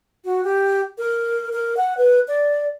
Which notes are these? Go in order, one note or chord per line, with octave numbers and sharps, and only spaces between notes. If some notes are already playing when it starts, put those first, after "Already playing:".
F#4
G4
A#4
A#4
F#5
B4
D5